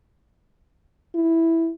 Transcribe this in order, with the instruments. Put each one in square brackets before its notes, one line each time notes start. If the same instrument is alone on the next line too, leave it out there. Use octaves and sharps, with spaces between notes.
[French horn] E4